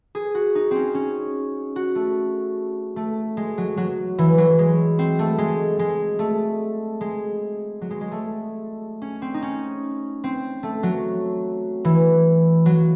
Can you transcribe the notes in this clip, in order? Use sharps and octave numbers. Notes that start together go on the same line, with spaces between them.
G#4
F#4
D#4
C4 C#4
C#4
F#4
A3
A3
G#3
F#3
F#3
E3
F#3
G#3
C4
A3
G#3
G#3
A3
G#3
F#3
G#3
G#3
A3
C#4
C4
D#4
C#4
C4
A3
F#3
E3
F#3